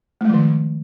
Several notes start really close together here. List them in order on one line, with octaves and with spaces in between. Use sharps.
A3 G#3 F3 D#3